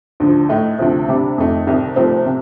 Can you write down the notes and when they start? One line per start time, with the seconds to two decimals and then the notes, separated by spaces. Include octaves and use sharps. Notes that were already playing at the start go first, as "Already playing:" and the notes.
0.20 D2 D3 F3
0.49 A2 A3 D#4
0.78 D2 C3 F3 A3
1.08 C3 G3 D4
1.38 F2 D#3 A3 D#4
1.67 C2 C3 D#3
1.96 C2 C3 F3 A3 C4
2.26 C3